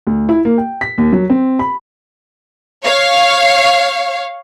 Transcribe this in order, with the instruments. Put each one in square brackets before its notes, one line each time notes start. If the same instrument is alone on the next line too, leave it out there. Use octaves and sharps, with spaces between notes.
[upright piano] D2
E4
A#3
G5
B6
D#2
F#3
C4
B5
[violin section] C#5 F5